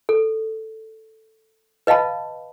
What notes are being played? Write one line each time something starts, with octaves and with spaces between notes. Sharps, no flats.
A4
B4 D#5 F5 A5 B5